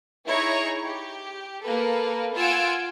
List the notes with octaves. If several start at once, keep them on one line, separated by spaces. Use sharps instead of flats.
D#4 E4 G#4 C#5 A#5
G4
A#3 A4 B4
F4 F#5 G#5 E6 D7